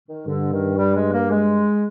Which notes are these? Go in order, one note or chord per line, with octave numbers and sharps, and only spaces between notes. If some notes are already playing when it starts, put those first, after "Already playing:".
D#3
G2 D3
D#3
G3
G#3
A#3
G#3